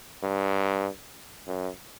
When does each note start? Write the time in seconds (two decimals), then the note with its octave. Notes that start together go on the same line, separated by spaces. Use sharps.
0.23 G2
1.47 F#2